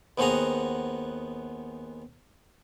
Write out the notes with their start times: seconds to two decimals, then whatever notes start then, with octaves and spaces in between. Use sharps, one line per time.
0.18 D#2 B3 C4 F#4 G#4 A#5